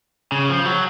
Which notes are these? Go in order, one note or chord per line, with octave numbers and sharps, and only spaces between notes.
C#3
F3
F#3